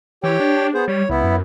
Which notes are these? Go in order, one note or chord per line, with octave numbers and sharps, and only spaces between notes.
E3 G4 C#5 G5
D4
B3 G#4 C5
G3 C#5
C#2 B3 E4
F#2